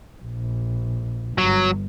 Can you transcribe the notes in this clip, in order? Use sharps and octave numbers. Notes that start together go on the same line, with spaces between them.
A#1
G1 F#3